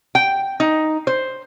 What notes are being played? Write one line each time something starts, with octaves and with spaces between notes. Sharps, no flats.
G5
D#4
C5